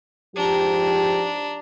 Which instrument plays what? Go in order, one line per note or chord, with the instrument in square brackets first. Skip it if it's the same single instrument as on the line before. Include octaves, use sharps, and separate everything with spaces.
[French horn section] G#2 F3 G4 [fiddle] D4 A#5